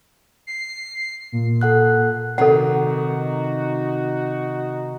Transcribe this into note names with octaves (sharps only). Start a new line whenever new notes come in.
C7
A#2
A4 F#5 F#6
C3 D#3 D#4 F#4 A4 F#5